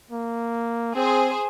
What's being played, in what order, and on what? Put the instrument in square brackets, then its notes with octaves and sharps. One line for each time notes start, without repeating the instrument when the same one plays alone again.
[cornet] A#3
[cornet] C4 [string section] G#4 C5